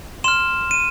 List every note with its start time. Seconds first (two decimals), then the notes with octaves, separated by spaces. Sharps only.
0.24 C6 F6 E7
0.71 D#7